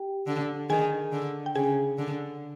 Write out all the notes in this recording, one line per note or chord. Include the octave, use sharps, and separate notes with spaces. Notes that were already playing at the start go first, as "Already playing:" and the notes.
Already playing: G4 G5
D3
D#3 G#4 G#5
D3
G5
C#3 G#4 G#5
D3